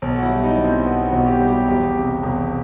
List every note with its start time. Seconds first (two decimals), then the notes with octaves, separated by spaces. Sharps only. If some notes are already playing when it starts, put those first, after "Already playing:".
0.02 B1
0.13 F#4
0.23 E4
0.29 G3
0.44 D#4
0.57 B1
0.64 C4
0.85 B2 B3
1.06 F#4
1.12 B1
1.26 G4
1.40 G3
1.47 G4
1.68 E1 G4
1.96 C3
2.23 E1